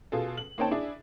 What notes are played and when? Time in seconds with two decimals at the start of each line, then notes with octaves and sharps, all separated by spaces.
0.12 B2 F4 G#4 A4
0.37 F#7
0.58 A#3 C4 D#4 C#5 G5 A5
0.71 D4 E4 G#4